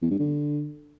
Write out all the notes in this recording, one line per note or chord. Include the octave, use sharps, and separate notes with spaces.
E2
G2
D3